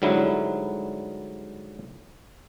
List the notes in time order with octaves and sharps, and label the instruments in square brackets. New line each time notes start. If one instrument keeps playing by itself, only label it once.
[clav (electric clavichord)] G#2 D3 F#3 G3 E4